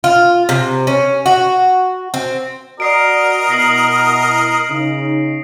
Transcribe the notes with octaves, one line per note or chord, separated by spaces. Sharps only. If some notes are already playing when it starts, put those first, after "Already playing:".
F4
C3
C#4
F#4
C4
F#4 A#4 D5 D#5 D#6 C7 D7
B2 E4 A#6 C7 F#7
C#3 D#4